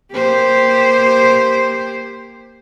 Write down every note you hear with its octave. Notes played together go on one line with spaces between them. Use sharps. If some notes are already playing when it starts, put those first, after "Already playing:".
A#3 G4 C5